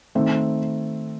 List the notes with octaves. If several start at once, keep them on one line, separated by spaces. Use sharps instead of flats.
D#3 A3 C4